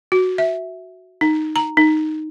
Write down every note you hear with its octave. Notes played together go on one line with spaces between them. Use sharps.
F#4
E5
D#4
A#5
D#4